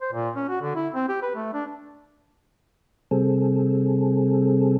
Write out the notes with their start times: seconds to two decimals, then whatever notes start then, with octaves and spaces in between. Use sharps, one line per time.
0.01 C5
0.13 A#2
0.36 C#4
0.49 F#4
0.61 D3
0.75 E4
0.94 C4
1.08 G4
1.22 B4
1.36 A3
1.53 D4
3.11 C3 G3 C4 G#4 A4